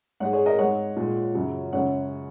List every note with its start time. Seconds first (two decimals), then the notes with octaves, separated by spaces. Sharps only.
0.20 G#2 G#3 C#5 F#5
0.33 G#4 C#5
0.46 A#4 D#5
0.58 G#2 G#3 C#5 F#5
0.96 A#2 G#3
1.34 F#2 C#3 F#3
1.73 F#2 C#3 G#3 C#5 F#5